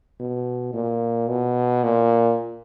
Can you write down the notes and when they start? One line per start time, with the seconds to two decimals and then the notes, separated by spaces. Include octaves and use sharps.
0.20 B2
0.73 A#2
1.29 B2
1.83 A#2